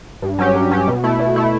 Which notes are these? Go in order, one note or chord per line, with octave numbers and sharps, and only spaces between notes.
G2
F#3 C#4 G4
G2
F#3 C#4 G4
B2
A3 E4
B2
A3 E4